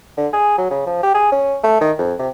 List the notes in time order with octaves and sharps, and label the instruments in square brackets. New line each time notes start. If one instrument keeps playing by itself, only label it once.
[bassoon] D3
G#4
F#3
C#3
F3
G4
G#4
C#4
A3
D#3
F2
C3